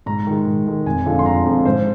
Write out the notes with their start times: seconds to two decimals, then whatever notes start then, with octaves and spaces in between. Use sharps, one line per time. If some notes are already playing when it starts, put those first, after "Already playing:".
0.06 G#2 A#5
0.27 D#3 G#3
0.46 G#2
0.67 D#3 G#3
0.86 F1 G#5
1.06 F2 D3 F3 G#3
1.19 C6
1.26 F1 A#5
1.45 F2 D3 F3 G#3
1.65 G#2 C5